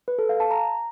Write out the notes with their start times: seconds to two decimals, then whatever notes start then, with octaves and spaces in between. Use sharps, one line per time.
0.08 B4
0.19 A4
0.29 F5
0.40 A5
0.51 A#5